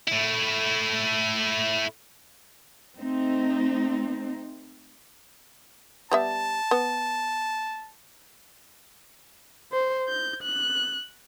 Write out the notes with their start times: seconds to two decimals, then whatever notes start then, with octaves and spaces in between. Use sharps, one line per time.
0.08 A3 E4
2.99 A3 C4 D#4
6.11 G3 B3 E5 A5
6.71 B3
9.72 C5
10.08 G6
10.42 F#6